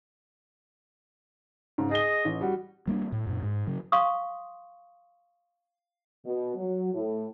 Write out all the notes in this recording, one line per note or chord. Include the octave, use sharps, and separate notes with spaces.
G#2 C#3
G#4 D#5 G7
A1
G3 F#4
G3 A#3 B3 D4
A2
F#2 A#2
G#2
C#3 F#3
F5 C6 C#6 D#6
B2
F#3
A2